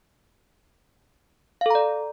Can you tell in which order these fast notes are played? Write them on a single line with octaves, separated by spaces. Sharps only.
F5 A4 A#5 D5